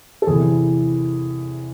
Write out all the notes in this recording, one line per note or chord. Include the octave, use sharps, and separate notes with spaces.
A4
E2 C3 E3 G#4